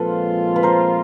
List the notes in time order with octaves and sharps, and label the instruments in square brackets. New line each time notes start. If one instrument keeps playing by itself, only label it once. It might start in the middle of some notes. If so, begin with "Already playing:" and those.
Already playing: [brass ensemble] A#2 F3 G#3 C4 F4 [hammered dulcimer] A4 B4
[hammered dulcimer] B4
A#4 C5